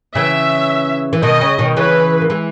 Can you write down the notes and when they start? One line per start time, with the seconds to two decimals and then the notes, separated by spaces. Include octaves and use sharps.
0.15 C#3 E3 E5
1.13 E3
1.23 B2 D#3 D#5
1.41 C#3
1.59 B2 D#3
1.77 C#3 E3 B4
2.21 A#3
2.30 E3 G#3